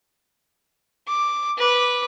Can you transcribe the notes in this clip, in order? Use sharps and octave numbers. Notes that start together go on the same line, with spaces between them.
D6
B4 D6